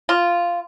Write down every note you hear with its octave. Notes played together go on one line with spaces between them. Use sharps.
F4